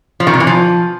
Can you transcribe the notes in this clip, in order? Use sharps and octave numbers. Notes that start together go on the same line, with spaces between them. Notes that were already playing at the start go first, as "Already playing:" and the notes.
F3
D#3
C3
E3
F3